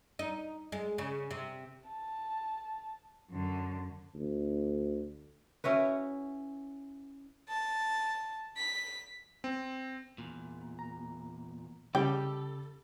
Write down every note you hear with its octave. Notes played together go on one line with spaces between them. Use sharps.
D#4
G#3
C#3
C3
A5
F#2 D3
D2
C#4 E4 F#4 B4
A5
B6
C4
E2 A#2
A#5
C#3 G3 G4 A4 G5